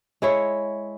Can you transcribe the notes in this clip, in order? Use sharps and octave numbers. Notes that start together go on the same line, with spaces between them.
G#3 E4 C#5